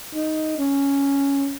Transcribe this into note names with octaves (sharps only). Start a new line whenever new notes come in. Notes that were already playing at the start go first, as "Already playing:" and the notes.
D#4
C#4